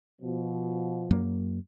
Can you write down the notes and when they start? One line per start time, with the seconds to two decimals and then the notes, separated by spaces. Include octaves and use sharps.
0.21 B2 F3
1.11 F#2 F#3 A#3